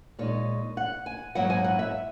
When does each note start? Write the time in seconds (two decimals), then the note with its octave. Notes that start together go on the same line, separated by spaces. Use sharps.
0.19 A#2 G#3 D#4 C#5
0.77 F#5
1.06 G#5
1.35 G#2 F#3 A#3 E4 F#5
1.50 G#5
1.64 F#5
1.79 E5